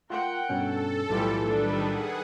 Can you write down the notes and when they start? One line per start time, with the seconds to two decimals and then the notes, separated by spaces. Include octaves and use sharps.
0.10 F4 A#4 F#5 G5
0.49 G2 B2 C#4 A4
1.09 B1 A2 E3 G3 F4 G4
1.44 D#3 G3 D4 A4 B4
1.83 G#4 F#5